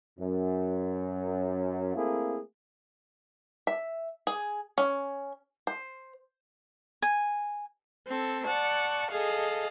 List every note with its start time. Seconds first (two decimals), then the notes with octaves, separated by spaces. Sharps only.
0.19 F#2
1.94 A3 A#3 C4 E4 G#4
3.67 E5
4.27 G#4
4.78 C#4
5.67 C5
7.02 G#5
8.07 C4 A4
8.44 D5 F#5 A5 C#6
9.10 G#4 A4 D#5 F5